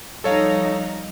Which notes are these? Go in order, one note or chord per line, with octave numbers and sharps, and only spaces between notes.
F3 G3 D#4 A4 C#5 F5